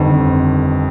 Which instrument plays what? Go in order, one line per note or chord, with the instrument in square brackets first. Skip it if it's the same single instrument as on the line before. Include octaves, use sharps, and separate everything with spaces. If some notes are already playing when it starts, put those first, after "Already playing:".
Already playing: [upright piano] G1 F2 D#3